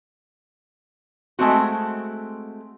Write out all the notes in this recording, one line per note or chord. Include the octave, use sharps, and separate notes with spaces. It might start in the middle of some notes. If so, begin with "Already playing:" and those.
G#3 A3 C4 F#4